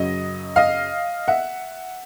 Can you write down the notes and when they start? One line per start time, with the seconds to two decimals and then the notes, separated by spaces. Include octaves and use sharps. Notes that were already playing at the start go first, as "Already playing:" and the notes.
Already playing: F#2 C#3 F#3 D#5
0.56 D#5 F5
1.28 E5 F#5